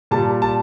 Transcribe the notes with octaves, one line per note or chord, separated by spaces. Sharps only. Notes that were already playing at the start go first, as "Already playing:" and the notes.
A#2 G3 A5
A5